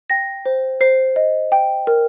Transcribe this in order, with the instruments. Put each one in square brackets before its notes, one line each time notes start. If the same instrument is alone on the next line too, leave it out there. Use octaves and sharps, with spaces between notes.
[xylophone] G5 A#6
C5
C5 C7
D#5
G5
A#4